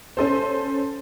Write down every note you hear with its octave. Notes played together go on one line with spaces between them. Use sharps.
C#4 A4 C5